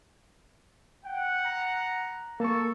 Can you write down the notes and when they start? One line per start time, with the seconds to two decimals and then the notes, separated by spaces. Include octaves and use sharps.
1.05 F#5 G5
1.45 A#5
2.40 A#3 A4 A5 C#6